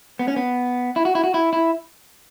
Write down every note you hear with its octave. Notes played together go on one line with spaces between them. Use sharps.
B3
C#4
B3
E4
F#4
E4
F#4
E4
E4